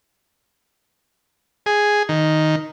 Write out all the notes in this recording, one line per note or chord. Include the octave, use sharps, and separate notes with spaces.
G#4
D#3